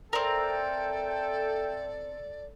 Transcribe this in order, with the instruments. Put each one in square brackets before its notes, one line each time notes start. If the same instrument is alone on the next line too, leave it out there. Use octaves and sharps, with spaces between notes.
[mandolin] C4 A#4 [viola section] A4 [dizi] D5 [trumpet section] E5 G5